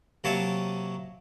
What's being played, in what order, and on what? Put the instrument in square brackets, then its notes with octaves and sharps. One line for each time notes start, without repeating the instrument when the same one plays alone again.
[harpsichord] C3 F#3 A#3 C#5 A5